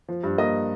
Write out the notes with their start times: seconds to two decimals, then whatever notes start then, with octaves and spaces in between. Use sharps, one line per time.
0.09 F3
0.24 G2
0.38 A#3 D#5